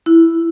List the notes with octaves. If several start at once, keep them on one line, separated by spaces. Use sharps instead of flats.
E4